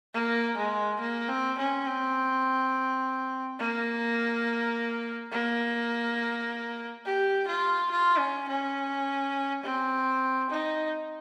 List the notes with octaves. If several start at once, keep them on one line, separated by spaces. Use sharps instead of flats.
A#3
G#3
A#3
C4
C#4
C4
A#3
A#3
G4
F4
F4
C#4
C#4
C4
D#4